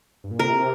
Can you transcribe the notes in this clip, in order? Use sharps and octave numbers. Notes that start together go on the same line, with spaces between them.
G2
A#2
C3 A#4